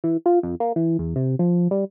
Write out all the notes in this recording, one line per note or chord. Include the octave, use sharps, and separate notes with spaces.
E3
F4
F2
A#3
E3
E2
C3
F3
G3